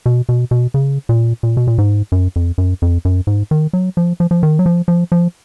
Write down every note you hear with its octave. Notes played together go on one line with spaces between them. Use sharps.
B2
B2
B2
C#3
A#2
A#2
B2
A#2
G#2
F#2
F2
F#2
F2
F#2
G#2
D#3
F#3
F3
F3
F3
D#3
F#3
F3
F3
F3